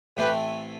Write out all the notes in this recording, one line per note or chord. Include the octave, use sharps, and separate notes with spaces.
A1 A2 E3 A3 C4 G4 B4